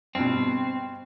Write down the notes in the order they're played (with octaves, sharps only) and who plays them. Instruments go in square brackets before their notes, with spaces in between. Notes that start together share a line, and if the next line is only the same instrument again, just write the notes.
[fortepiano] G2 B2 [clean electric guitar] C4